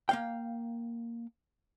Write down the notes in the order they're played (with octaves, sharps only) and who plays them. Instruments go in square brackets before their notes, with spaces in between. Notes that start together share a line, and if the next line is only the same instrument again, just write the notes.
[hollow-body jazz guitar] A#3 F5 G5